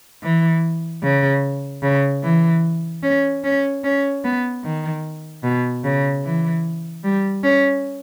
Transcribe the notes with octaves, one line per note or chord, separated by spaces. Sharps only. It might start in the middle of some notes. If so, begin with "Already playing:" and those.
E3
C#3
C#3
E3
C#4
C#4
C#4
B3
D#3
B2
C#3
E3
G3
C#4